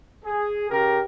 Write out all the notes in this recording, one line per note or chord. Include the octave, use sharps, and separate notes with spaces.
G#4
C#3 G4 A#4